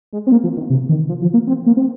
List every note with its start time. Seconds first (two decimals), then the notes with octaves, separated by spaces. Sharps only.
0.13 G#3
0.27 C4
0.32 A#3
0.44 F3
0.57 D#3
0.70 C3
0.89 D#3
1.09 F3
1.22 F3
1.34 A#3
1.47 C4
1.66 A#3
1.77 C4